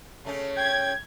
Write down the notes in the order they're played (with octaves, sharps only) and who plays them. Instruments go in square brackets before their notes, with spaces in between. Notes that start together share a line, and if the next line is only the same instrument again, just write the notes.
[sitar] C#3 A3 C#4
[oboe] G5 [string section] G#6